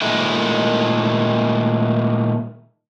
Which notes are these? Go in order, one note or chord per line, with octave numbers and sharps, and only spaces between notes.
A#2 D#3 G#3 A3 E4